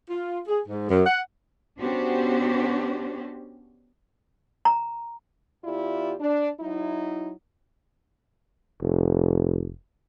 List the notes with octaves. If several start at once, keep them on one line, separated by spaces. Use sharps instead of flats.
F4
G#4
G#2
F#2
F#5
B3 C#4 D4 F#4 G4 C5
A#5
E2 E4 F4 G4 D5
D4
F#3 D#4 E4
F1